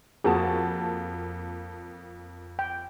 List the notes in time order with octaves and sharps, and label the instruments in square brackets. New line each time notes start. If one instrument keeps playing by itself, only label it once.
[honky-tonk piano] F2 A#3 A5 [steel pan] F#4 G#4
[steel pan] G5